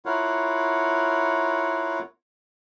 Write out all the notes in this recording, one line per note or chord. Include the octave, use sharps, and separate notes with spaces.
E4 F4 A#4 C#5 F5 F#5